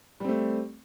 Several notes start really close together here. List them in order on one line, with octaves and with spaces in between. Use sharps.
G3 C4 A3